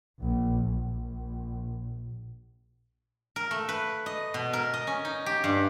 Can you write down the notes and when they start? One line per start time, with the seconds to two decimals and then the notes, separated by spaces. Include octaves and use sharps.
0.21 A#1
0.67 A#1
3.36 A#4
3.51 A3
3.69 B4
4.06 D#5
4.34 B2
4.53 A#4
4.74 D#5
4.87 C#4
5.05 D#4
5.26 G4
5.44 G2